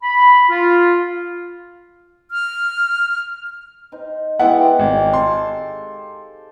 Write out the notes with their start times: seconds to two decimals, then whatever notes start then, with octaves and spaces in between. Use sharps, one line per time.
0.03 B5
0.50 F4
2.31 F6
3.92 D#4 C5
4.39 G#3 B3 E4 G4 F5 F#5
4.79 G#1
5.13 A4 C6